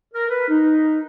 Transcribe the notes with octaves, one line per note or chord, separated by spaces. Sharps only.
A#4
B4
D#4